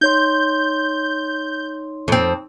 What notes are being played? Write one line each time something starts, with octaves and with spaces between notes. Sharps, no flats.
D#4 C#5 C6 G6
F2 C4